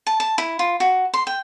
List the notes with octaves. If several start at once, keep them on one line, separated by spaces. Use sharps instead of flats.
A5
A5
E4
F4
F#4
C6
G5